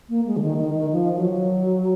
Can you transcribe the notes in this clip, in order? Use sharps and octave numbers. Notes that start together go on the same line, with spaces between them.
A#3
G#3
D3
D#3
D#3
D#3
F3
F#3